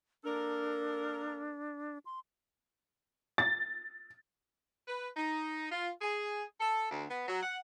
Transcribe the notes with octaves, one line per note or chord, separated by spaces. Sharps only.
A#3 D4 A4 A#4
C6
A6
B4
D#4
F4
G#4
A4
D2
B3
F#3
F#5